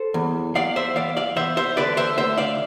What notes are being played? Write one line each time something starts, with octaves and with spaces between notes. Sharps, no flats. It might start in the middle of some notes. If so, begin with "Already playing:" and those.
Already playing: A4 C5
E2
E2 D5 F5
C5 E5
E2 D5 F5
D5 F5
E2 C5 E5
C5 E5
D3 B4 D5
C5 E5
D2 C5 E5
D5 F5